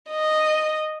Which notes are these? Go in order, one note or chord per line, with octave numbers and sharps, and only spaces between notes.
D#5